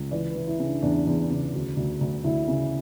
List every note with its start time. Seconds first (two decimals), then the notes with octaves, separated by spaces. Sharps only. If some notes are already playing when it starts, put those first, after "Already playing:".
Already playing: C#2
0.11 E3 D5
0.30 B4
0.36 E3
0.47 E4
0.59 C#3
0.65 D4
0.82 E2 D4
1.07 E2
1.30 C#3
1.53 D2
1.77 D2
2.01 D2
2.24 D2 E4
2.48 C#3